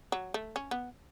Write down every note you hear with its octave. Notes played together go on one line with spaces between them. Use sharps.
F#3
A3
C#4
B3